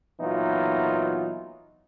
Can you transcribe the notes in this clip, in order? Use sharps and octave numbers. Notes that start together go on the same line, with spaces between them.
A#2 E3 F#3 B3 D#4 F4